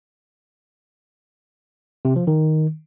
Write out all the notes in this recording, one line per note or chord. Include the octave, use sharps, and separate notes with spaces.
C3
F3
D#3